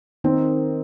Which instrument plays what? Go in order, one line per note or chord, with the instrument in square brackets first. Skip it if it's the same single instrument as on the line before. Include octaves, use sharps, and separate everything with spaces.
[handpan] D#3 D#4 [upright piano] C4